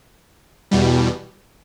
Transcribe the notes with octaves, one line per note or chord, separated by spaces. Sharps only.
E2 B2 G3